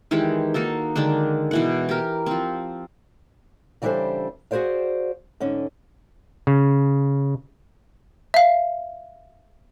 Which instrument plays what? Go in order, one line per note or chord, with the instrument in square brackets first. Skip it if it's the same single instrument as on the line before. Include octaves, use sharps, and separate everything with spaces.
[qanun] D#3 E3 G#3 G4
A#3 D#4 F#4 A4
D3 D#3 G#3 D4
B2 E3 F#5
G4 A#4
F3 C4
[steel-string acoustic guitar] C#3 E3 G3 D4 A4 C5
F#4 G#4 B4 C5 D5 F5
G#2 D3 C#4
[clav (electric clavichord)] C#3
[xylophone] E5 F5